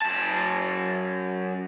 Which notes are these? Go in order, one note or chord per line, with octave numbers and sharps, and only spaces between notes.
F#2 A5